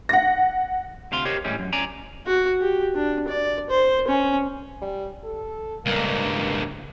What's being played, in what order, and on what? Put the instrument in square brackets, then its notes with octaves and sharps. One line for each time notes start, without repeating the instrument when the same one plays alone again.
[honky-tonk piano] F#5 A#6
[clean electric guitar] D2 C3 F5 C6
G4 A#4 C5 C#5 D#5
A2 E3 G3 G#3 C#4
F#2
C#4 C#5 D5 G#5 A#5
[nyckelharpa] F#4
G4
D4
D5
C5
C#4
[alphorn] G3
A4
[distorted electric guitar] C#2 G2 [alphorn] A#3